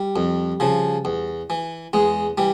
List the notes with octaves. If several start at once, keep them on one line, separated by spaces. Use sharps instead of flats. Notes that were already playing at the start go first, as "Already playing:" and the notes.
Already playing: G3
F2
C#3 F3
E2
E3
E2 G#3
E3 G3